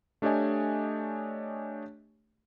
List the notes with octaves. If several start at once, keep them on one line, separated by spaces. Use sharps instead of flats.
A3 D4 G4 C#5 D#5 G#5